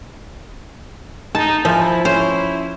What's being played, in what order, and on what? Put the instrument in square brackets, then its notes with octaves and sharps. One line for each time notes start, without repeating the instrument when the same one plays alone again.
[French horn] D#4 [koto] A5
[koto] F3 [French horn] E4 [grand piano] C5 G#5
[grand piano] C#4 [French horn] E4 [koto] C5